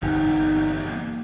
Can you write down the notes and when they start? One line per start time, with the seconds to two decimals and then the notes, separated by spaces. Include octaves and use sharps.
0.02 G1 E2 C3 G3 D#4
0.89 A#3